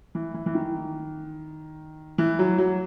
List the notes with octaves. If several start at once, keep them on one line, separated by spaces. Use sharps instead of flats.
E3
E3
E3
D#3
E3
F#3
F#3